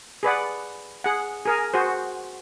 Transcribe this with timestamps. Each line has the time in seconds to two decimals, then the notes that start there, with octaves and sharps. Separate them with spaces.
0.23 G#4 B4 D5 F#5
1.04 G#4 F#5
1.46 G#4 A#4 G#5
1.74 F#4 G#4 C5